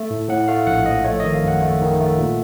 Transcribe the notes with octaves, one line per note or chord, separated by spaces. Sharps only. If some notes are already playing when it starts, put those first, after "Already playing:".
Already playing: A3
A2
A2 F#5
A3 F5
A#1 F#5
F3 D#5
A3 C#5
D#3 D#5
F5
F#2 F#5
A3
D#3
A3
A#2